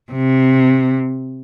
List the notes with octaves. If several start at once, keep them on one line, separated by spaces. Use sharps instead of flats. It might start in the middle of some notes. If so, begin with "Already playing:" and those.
C3